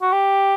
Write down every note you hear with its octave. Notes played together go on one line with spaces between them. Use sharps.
F#4
G4